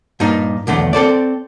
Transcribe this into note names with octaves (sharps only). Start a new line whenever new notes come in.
G2 A#2 D#4
B1 E2 D3 A3
C4 A4 C5 D5